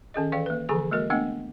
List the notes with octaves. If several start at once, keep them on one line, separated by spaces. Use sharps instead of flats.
D#3 C#4 G#4 D#5
E3 A4 D5 F5 G5
A#3 B4
D3 E3 F3 G#4 A4 A#5
G#3 A#3 F#4 A#4 D#5
A3 B3 D4 F#5 G5